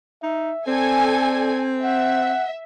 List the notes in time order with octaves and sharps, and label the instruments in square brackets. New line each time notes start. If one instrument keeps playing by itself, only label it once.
[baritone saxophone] D#4 [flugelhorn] E5
[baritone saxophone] C4 [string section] A4 G#5 [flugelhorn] D5
[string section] E5 [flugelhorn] F#5